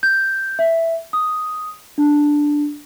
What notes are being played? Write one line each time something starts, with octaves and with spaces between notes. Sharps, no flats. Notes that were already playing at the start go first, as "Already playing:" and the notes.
G6
E5
D#6
D4